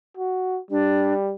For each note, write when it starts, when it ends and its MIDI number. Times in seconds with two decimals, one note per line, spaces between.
0.17 0.60 66
0.71 1.34 55
0.71 1.14 62